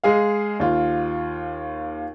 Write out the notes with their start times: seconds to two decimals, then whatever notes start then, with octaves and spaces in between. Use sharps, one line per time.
0.04 G#3 G#4 F5
0.60 D#2 F4